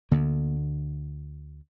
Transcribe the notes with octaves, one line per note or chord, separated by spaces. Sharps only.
D2 D3 A#3